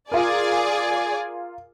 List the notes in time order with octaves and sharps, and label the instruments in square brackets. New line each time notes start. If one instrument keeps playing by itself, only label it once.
[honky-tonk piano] F4 A#4 [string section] G#4 D5 G#5